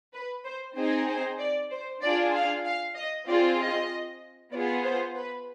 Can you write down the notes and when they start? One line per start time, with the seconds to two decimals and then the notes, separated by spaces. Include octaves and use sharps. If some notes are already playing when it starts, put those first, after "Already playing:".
0.14 B4
0.45 C5
0.76 C4 D#4 G#4 C5
1.08 C5
1.39 D5
1.71 C5
2.02 D4 F4 G#4 D5
2.34 F5
2.65 F5
2.96 D#5
3.27 C4 F4 G#4 D5
3.59 D#5
4.52 B3 F4 G#4 D5
4.84 C5
5.16 B4